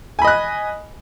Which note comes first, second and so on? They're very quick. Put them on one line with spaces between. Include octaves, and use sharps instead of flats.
G#5 B5 D#5 F#6